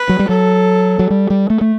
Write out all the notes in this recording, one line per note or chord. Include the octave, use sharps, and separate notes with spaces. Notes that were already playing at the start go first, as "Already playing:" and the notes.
Already playing: B4
F#3
G3
F#3 A4
F#3
G3
G3
A3
A3